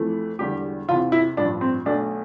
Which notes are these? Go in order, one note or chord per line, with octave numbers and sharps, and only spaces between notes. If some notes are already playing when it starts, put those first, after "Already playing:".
Already playing: F2 E3 A3
E1 E2 D3 G3 G4
E2 C3 E3 F4
E4
A1 G2 F3 D4
C4
B1 B2 A3 D4